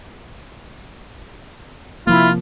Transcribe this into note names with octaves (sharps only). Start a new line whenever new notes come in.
C3 F3 A#3 E4 F4 B5